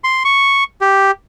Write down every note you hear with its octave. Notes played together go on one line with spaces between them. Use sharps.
C6
C#6
G4